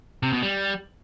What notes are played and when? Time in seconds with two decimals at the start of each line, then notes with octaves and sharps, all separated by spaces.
0.23 C3
0.33 B2
0.42 G3